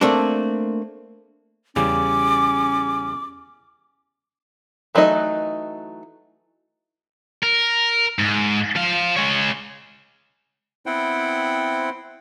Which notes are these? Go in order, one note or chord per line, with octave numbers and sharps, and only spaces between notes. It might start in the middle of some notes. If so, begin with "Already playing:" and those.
A3 A#3 C4 D4
E2 C#3 G3 C#4 D6
E3 F#3 A3 D#4 D#5
A#4
G#2
F3 F5
G#3 C#5
B3 C4 E4 C5 F#5 G5